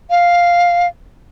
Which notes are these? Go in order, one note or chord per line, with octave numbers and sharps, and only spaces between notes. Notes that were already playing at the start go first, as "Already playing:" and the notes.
F5